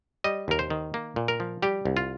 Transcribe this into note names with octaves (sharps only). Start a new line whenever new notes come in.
G3 D#5
D#2 A#4
C5
D#3
A#3
A#2
A#4
F3
G3 G4
C2
F4